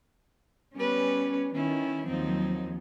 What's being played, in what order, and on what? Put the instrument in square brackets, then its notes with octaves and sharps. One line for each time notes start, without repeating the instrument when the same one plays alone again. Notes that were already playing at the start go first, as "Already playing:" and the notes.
[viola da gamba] G3 B3 B4 [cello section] C#4
[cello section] D#3 [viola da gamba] C#4 E4
[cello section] D#2 F3 F#3 [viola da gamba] C4 D#4